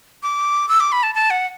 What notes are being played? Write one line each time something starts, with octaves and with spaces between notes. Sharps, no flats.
D6
E6
D6
B5
A5
A5
F#5